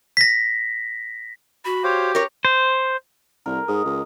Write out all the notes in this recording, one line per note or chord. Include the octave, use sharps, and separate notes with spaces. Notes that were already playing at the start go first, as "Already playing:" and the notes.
A#6 B6
F#4 B5
G4 C5 C#5 F5
A#4 C#5
C5
C2 A#4
G#2 D#5
C#2